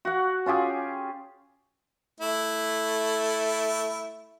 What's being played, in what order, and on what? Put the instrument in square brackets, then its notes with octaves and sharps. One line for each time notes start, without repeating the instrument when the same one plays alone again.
[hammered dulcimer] F#4 F#5
C#4 F4 G4 G#4
[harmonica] A3 E4